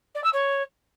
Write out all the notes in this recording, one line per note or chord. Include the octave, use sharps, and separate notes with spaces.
D5
E6
C#5